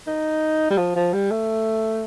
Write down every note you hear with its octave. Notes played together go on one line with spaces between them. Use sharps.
D#4
G3
F3
F3
G3
A3